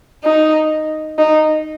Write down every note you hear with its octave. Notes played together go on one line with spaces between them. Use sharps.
D#4
D#4